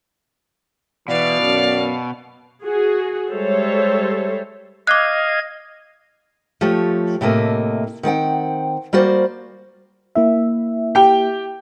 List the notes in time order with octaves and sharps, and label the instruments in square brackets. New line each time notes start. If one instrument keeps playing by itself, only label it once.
[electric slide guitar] B2 [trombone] E3 [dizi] D5 [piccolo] F5
[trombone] F#2
[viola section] F#4 G#4
G3 G#3 A4 C5 C#5 E5
[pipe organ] D#5 F5 G#6 [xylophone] D6 F#6
[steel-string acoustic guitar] F3 A3 G4 C#5
A2 C3 A3 A#3 D#5
D#3 C4 F#5 G5
G3 A#3 F#4 C5 D5
[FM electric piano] A#3 E4 E5
[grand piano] G4 G5